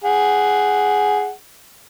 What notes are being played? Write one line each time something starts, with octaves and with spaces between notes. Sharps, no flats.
G#4 F#5